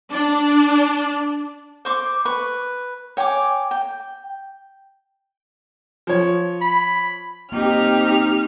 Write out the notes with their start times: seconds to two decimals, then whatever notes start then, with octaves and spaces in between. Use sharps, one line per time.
0.11 D4
1.85 C5 C#6 D6
2.25 B4 C#6
3.17 C#5 G5 G#5 D6
3.71 G5
6.07 F3 C#5
6.61 B5
7.52 A#3 C4 D#4 G4 F6